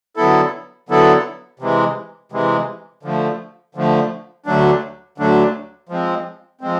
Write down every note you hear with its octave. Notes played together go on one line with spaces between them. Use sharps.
D3 F#3 B3 E4 A4
D3 F#3 B3 E4 A4
C3 E3 G#3
C3 E3 G#3
D3 F3 A3
D3 F3 A3
D2 D3 F#3 A3 D4
D2 D3 F#3 A3 D4
F3 G#3 C4
F3 G#3 C4